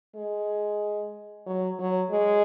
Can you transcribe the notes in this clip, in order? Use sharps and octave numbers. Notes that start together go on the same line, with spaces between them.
G#3
F#3
F#3
G#3